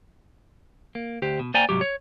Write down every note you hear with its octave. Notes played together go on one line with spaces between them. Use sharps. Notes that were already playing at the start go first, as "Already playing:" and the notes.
A#3
D2 G4 C5
B2
A#3 C5 D5 G5 G#5 A#5
C2 G#2 F#3 G4
C#5